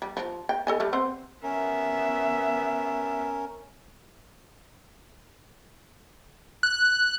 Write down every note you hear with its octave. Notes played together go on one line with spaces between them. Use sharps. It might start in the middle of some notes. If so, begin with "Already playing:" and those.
G3
F3
G5
A4 D#5 G#5
G3 A3
C4 C5 F#5
B3 C#4 A#4 E5
F#6